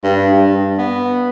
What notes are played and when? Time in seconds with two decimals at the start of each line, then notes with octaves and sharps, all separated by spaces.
0.04 G2
0.33 G2
0.78 B3